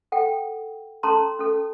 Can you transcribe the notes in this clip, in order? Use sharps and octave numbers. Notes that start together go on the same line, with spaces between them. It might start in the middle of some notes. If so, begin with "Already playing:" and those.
A4 F#5 G5
C#4 A4 A5 A#5 C6
C#4 A4